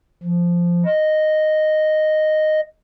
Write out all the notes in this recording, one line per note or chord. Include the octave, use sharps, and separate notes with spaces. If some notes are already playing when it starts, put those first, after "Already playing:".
F3
D#5